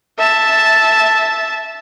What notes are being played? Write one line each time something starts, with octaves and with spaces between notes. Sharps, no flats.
E5 A5